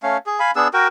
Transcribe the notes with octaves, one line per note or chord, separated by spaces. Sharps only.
A3 C#4 F5
G#4
F5 G#5 B5
B3 D4 G#4 E6
F#4 A#4 G5